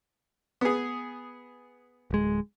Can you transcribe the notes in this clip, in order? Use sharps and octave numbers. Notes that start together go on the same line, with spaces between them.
B3 G#4
D1 G#3